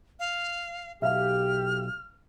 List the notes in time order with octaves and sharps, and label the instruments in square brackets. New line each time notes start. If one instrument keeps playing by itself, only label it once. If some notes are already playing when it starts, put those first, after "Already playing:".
[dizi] F5
[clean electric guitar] B1 [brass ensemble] G4 [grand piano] E5 F5 [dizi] F6